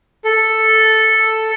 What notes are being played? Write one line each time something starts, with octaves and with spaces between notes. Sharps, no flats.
A4